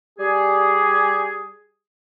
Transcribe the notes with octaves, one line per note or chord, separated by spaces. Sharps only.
G3 G4 G#4